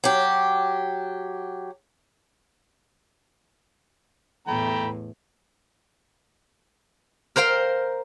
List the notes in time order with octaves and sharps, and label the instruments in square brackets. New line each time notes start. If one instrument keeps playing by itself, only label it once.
[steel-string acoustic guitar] F#3 G4
[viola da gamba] E2 A2 [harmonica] A3 G5 A#5 [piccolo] B5
[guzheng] A#4 C5 F5 G5